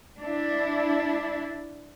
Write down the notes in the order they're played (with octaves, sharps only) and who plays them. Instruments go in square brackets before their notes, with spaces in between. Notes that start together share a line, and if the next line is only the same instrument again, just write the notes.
[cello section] D4 E4